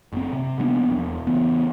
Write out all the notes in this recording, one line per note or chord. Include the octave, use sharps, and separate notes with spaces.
F#1 C4
C3
F3 A#3 B3 D4
E1
C#3 E3 B3